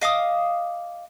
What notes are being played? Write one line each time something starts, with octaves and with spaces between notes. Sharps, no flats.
D#5 F5 D6 D#6